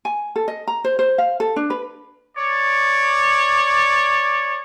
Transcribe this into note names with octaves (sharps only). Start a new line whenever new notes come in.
G#5
A4
D#5
A#5
C5
C5
F5
A4
D4
B4
C#5 D5